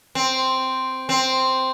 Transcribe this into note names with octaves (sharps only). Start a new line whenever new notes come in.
C4
C4